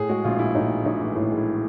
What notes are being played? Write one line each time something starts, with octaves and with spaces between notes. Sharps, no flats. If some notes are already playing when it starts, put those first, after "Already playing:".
Already playing: A2 G#4
G#3 F#4
A#1 F4
E3 E4
A2 D#4
G#3
A#1 D#4
E3
A2 E4
G#3
E4